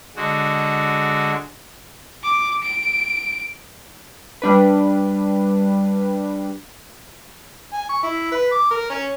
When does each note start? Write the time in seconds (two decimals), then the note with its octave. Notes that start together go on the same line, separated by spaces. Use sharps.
0.16 D3 G#3 F#4
2.24 D6
2.63 D7
4.42 G3 D4 B4
7.73 G#5
7.89 C#6
8.03 E4
8.31 B4
8.52 D6
8.71 A#4
8.90 C#4